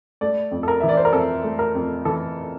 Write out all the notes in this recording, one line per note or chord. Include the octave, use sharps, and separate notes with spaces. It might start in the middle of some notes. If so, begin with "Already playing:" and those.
A3 D5
F2
A4
A#4
E3 E5
D5
C5
A#4
F2 A4
A3
A#4
F2
E3 A4